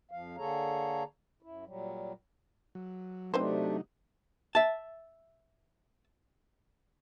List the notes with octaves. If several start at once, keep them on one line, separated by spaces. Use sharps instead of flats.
F2 F3 F5
D3 A#3 G#4 A4 C#5 A#5
F#2 E4
A#2 F#3 G3
F#3
C3 F#3 A3 C4 D4 D#4 B4 C5
E5 A5